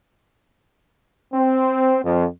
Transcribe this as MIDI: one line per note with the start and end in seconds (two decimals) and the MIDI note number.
1.33 1.99 60
2.03 2.25 41